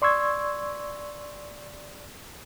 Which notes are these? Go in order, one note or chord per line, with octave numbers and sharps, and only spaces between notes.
D5 C6 C#6 E6 G#6